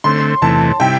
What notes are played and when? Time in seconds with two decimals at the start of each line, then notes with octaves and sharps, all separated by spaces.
0.04 D3 A3 C4 C6
0.42 E2 C3 E3 A3 A5
0.80 C3 G3 E4 G5